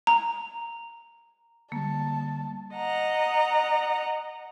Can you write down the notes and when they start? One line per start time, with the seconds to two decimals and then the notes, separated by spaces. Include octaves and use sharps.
0.07 A#5
1.72 D3 G3 A#3 A5
2.75 D#5 F#5 A#5